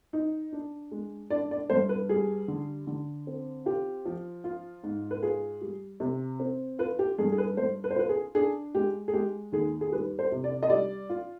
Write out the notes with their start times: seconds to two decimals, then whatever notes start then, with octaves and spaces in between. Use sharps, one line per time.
0.13 D#4
0.52 D4
0.91 G#3
1.30 D4 D5
1.51 D5
1.70 G2 C5
1.89 B4
2.09 G3 G#4
2.48 D3
2.87 D3
3.27 C4
3.66 F4 G4
4.05 F3
4.44 F4
4.83 G#2
5.11 B4
5.22 F4 G#4
5.61 G3
6.00 C3
6.40 C4
6.79 F4 B4
6.99 G4
7.18 G2 G#4
7.32 G#4
7.38 B4
7.57 G2 C5
7.84 B4
7.91 C5
7.96 F4 B4
8.09 G#4
8.35 D4 G#4
8.74 G#3 G4
9.08 G#4
9.13 G#3 G4
9.52 D#2 G#4
9.81 G#4
9.92 G3 B4
10.19 C5
10.32 C3
10.44 D5
10.63 D#5
10.70 G3 D5
11.10 F4